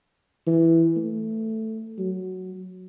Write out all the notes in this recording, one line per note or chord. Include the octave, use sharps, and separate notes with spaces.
E3
A3
F#3